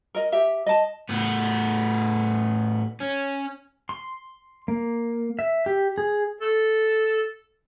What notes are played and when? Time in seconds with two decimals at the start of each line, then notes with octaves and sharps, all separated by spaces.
0.15 A#4 D#5
0.32 G4 E5
0.66 D#5 A5
1.09 A2 B3
3.00 C#4
3.89 C6
4.68 A#3
5.39 E5
5.66 G4
5.98 G#4
6.41 A4